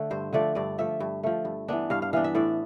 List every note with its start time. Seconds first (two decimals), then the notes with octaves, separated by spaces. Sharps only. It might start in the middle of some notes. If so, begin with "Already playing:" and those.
Already playing: D3 A3
0.11 G2 C5
0.33 D3 F3 A3 D5
0.55 G2 D5
0.78 F3 A3 E5
1.00 G2
1.23 F3 A3
1.45 G2
1.68 E3 B3 D4
1.90 G2 F5
2.02 F5
2.13 E3 B3 D4 F5
2.24 E5
2.35 A2 D5